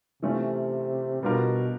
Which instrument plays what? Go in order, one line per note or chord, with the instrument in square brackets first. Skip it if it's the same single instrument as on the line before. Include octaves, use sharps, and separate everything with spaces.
[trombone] C3 [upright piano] E3 A3 C#4 F4
[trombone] B2 [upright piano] G3 B3 D4 F4 A#4